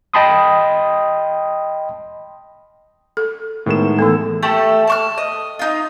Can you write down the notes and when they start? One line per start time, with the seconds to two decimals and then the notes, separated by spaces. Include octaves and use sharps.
0.14 D#5 G5 A5 B5 C6 D#6
3.17 A4
3.66 A2 D#3 G#3 B3 A#4 E7
3.99 E3 A3 B3 A4
4.43 A3 G4 A4
4.87 A5 C#6 F6
5.18 D#5
5.59 D#4 F4